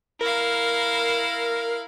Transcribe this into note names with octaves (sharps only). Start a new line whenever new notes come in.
E4 A#4 F5